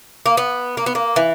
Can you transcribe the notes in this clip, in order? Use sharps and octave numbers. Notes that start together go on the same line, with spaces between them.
A#3
B3
A#3
B3
A#3
E3